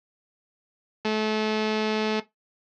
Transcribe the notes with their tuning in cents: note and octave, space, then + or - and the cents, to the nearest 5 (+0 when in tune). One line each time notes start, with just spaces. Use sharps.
A3 -30